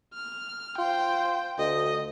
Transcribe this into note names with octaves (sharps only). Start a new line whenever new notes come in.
F6
F4 C5 G5
D2 D#5